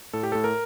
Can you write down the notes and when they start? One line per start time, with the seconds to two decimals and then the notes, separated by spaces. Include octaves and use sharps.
0.13 A2 A4
0.23 G4
0.32 A2 A4
0.44 A#4